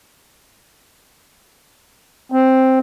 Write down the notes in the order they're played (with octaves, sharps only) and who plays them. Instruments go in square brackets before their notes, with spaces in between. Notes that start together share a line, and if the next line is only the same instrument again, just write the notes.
[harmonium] C4